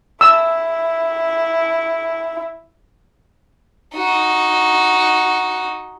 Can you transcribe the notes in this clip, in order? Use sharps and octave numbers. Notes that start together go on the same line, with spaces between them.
E4 E6
D#4 F#4